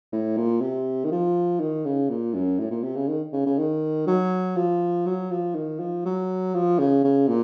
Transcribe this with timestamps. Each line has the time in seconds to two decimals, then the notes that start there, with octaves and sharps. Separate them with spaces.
0.13 A2
0.37 A#2
0.61 C3
1.04 D#3
1.12 F3
1.60 D#3
1.86 C#3
2.10 A#2
2.34 F#2
2.59 A2
2.71 A#2
2.84 C3
2.96 C#3
3.08 D#3
3.33 C#3
3.46 C#3
3.58 D#3
4.07 F#3
4.56 F3
5.06 F#3
5.31 F3
5.55 D#3
5.80 F3
6.05 F#3
6.54 F3
6.79 C#3
7.04 C#3
7.28 A#2